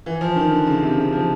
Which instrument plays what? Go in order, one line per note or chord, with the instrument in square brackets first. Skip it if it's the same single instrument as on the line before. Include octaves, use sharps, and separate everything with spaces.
[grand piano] E3
F3
D#3
D3
C#3
C3
C#3
F3